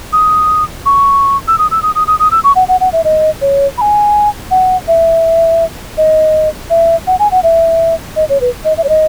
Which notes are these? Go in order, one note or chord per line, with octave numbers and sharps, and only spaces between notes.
D#6
C#6
E6
D#6
E6
D#6
D#6
D#6
D#6
E6
C#6
F#5
F#5
F#5
E5
D#5
C#5
B5
G#5
F#5
E5
D#5
E5
F#5
G#5
F#5
E5
D#5
C#5
B4
D#5
E5
C#5
D#5